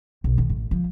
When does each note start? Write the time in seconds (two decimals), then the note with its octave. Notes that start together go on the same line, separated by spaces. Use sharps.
0.24 B1
0.38 D#3
0.49 A1
0.71 F3